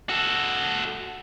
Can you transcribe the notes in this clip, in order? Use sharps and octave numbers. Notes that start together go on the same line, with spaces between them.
F#4 A4